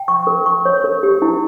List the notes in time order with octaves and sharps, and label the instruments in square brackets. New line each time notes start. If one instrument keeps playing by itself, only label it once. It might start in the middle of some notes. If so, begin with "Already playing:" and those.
Already playing: [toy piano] G5
C#6
A#4
C#6
C#5
A#4
G4
E4